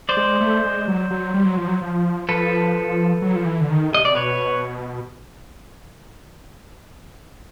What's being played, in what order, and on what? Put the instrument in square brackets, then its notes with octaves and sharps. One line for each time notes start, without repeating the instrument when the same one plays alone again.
[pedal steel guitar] C5 D5
[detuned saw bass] G#3
A3
G#3
F#3
F#3
G3
F#3
F3
F#3
F3
[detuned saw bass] F3 [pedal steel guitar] A4 B4
[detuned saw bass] F#3
F3
E3
D3
D#3
[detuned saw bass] C3 [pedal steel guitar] D#5
[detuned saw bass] C3 [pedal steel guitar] D5
[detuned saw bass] B2 [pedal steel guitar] B4 C#5